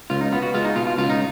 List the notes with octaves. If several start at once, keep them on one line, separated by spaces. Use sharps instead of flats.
C#2 F4
D#4
B3 F4
F#4
G#3 F4
D#4
B2 F4
F4
C#2 F4
D#4